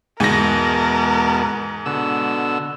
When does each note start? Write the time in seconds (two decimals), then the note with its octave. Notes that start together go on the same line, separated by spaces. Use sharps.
0.20 E2 G#2 B2 A#4 A5 A#6
1.86 B2 D3 E6